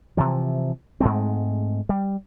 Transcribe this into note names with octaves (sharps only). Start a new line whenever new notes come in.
C3 E3 F3
G#2 G#3 A3 C4
G3